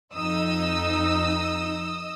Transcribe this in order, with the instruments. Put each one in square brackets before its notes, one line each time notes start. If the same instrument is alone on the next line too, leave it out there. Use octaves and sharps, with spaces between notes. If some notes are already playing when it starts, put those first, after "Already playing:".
[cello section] F2 D#4 [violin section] D#5 D#6 E6